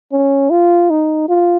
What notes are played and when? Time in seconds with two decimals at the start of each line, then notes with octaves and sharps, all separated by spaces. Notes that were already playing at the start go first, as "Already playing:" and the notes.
0.12 C#4
0.50 F4
0.90 D#4
1.29 F4